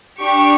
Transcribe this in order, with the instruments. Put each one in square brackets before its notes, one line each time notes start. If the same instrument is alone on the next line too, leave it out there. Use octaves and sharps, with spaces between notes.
[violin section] D4 G4 C#6